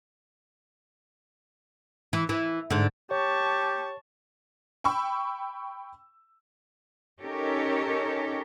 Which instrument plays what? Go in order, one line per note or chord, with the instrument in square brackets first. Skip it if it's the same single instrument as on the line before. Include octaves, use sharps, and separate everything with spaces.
[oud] E3
E3
G#2 D3
[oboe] G4 [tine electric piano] C#5 [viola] A5 C#6
[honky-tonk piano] G5 B5 C#6 E6
[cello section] C#4 D#4 G4 A4 A#4 C#5